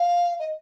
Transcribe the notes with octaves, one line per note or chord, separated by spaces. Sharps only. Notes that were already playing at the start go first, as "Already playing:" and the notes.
Already playing: F5
D#5